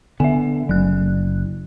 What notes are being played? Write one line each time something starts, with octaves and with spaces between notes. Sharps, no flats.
D3 B3 E5 G#5
F#1 F#3 F#6